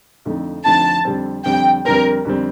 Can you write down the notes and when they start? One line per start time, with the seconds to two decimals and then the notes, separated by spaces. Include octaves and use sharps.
0.25 F2 D3 F3 A3 D#4
0.65 F2 D3 F3 A3 D#4 A5
1.05 F2 D3 G3 C4
1.45 F2 D3 G3 C4 G5
1.85 F2 D3 G3 C4 A#4
2.25 F2 D3 G3 C4